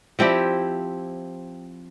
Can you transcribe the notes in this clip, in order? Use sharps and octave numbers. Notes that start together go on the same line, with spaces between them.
F3 C4 E4 G4